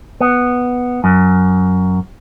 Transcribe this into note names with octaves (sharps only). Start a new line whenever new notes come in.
B3
F#2